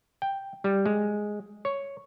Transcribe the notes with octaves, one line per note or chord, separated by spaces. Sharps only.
G5
G3
G#3
C#5